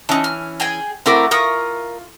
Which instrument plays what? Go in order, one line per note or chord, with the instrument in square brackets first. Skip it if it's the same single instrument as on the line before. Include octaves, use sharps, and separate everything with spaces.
[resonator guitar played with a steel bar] E3 C#4 [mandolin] D#4 A5
[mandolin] F6
G#4 G5 G#5
[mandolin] A3 F#4 D6 [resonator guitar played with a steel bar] C4 E4 A#4
[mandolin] F4 C#6 D#6 [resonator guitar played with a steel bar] A#4